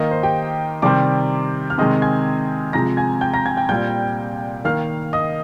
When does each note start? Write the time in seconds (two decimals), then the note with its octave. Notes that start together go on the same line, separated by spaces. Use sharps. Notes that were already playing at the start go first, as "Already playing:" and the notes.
Already playing: D#3 A#3 D#4 D#5
0.11 C5
0.23 G4 G5
0.82 C3 D#3 G3 C4 D5 D6
1.70 F6
1.78 C3 D#3 G#3 C4 D#5 D#6
2.02 G#5 G#6
2.73 C3 F3 G#3 A#5 A#6
2.97 G#5 G#6
3.21 G5 G6
3.33 A#5 A#6
3.46 G#5 G#6
3.57 G5 G6
3.69 A#2 G3 C4 G5 G6
4.65 D#3 A#3 F5 F6
5.13 D#5 D#6